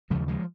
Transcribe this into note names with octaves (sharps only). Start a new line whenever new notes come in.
D#2 C#3 F3 G#3
F3 G#3